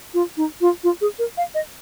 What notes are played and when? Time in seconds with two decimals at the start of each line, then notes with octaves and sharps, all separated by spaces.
0.14 F4
0.37 D#4
0.61 F4
0.84 F4
1.01 G#4
1.19 A#4
1.37 F5
1.55 D#5